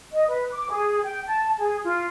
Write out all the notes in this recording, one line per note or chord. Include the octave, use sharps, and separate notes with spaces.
D#5
B4
D6
G#4
G5
A5
G#4
F4